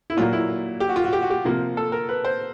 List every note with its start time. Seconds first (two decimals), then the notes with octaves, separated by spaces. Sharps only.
0.10 E4
0.17 A#2 F#3 A#3 F4
0.33 E4
0.80 G4
0.89 F#4
0.96 F4
1.04 F#4
1.13 G4
1.22 F#4
1.30 G4
1.45 C3 F3 A#3
1.77 A4
1.92 A#4
2.09 B4
2.25 C5